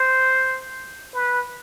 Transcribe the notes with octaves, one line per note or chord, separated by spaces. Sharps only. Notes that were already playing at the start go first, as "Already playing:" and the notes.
Already playing: C5
B4